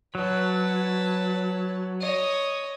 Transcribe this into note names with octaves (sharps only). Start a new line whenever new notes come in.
F#3 B4 A5
C#5 D#5